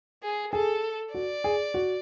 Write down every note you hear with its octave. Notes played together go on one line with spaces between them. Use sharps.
G#4
G#4 A4
F#4 D5
G#4
F#4